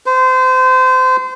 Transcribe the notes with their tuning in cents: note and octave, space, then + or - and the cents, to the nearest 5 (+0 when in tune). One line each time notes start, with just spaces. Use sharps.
C5 -30